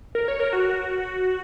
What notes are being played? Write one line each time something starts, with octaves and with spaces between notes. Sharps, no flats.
A#4
C#5
A#4
F#4